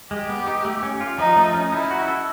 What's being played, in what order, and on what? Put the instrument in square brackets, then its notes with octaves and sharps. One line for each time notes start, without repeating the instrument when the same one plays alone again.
[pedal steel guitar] G#3 [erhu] G4
[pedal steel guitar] B3
D#4
A3
C#4
F4
[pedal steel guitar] F3 [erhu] D#4
[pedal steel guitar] A3
C#4
[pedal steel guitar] D#4 [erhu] E4
[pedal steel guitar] F#4
A4